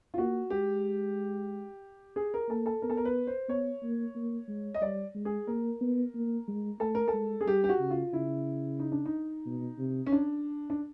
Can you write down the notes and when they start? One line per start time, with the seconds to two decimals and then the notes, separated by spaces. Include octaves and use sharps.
0.14 F4
0.18 A#3 F#4
0.50 G#3 G4
2.16 G#4
2.34 A#4
2.49 A#3 A4
2.66 A4
2.82 B3 A#4
2.90 A4
2.97 A#4
3.05 B4
3.27 C5
3.49 B3 C#5
3.83 A#3
4.15 A#3
4.48 G#3
4.74 D#5
4.81 G3 D5
5.15 G#3
5.25 G#4
5.47 A#3 A#4
5.81 B3
6.14 A#3
6.48 G#3
6.80 A3 A4
6.95 A#4
7.08 A4
7.13 G#3
7.41 G#4
7.46 G3 G4
7.64 G4
7.69 F#4
7.79 C#3
7.90 F4
8.13 C#3 E4
8.80 D#4
8.92 D4
9.06 D#4
9.46 B2
9.78 C3
10.06 C#4
10.12 D4
10.70 D4